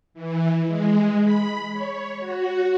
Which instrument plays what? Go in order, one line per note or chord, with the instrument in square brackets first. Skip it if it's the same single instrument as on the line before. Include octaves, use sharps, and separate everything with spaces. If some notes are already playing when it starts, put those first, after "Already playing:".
[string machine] E3
G#3
B5
C#5
F#4